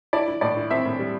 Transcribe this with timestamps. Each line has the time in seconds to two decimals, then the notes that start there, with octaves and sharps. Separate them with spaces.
0.13 E4 D5
0.28 E4
0.41 A2 D5
0.57 E4
0.71 C4 E5
0.85 A2
0.99 G3